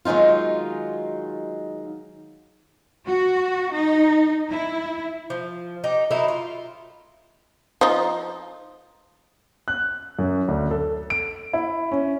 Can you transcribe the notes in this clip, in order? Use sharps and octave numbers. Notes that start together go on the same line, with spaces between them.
D#3 F#3 G#3 D#4 F4
F#4
D#4
E4
F3
D#4 G4
F#3 A#3 D#4 E4
F4
F3 D#4
F#6
F#2
D2
A4
D7
E4
C#4